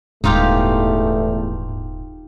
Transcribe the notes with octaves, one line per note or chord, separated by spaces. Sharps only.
D#1 E2 G#2 A3 D#4 F4 G4